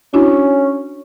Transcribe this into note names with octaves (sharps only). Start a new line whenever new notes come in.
C#4 D4 E4 F#4